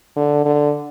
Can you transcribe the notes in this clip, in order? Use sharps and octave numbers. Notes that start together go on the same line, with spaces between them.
D3
D3